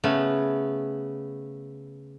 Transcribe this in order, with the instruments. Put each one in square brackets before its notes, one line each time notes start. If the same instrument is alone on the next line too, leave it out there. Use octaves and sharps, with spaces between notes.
[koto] C#3 A3 B3